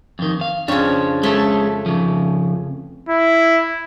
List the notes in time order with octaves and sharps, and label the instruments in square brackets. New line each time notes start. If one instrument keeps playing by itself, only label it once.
[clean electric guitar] F2 D#3
F5
[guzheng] F2 C#3 [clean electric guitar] D4 C#5
[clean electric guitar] G#3 C#4 A4 [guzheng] A3
[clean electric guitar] C#3 F3
[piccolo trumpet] E4